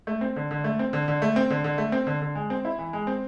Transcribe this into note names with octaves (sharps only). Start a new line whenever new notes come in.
A3
C4
D3
D3
A3
C4
D3
D3
A3
C4
D3
D3
A3
C4
D3
D3
G#3
C4
E4
E3
G#3
C4